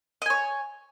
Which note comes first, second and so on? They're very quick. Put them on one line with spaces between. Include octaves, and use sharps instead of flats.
D#5 G#5 C#5